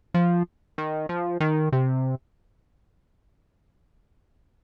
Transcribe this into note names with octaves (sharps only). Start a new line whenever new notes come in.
F3
D#3
F3
D#3
C3